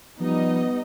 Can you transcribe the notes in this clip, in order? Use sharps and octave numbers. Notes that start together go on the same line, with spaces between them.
F3 G3 B3 D#4 D#5